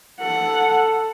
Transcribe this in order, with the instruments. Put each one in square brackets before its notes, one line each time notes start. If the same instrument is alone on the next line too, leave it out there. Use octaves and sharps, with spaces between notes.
[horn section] A4 [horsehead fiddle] F#5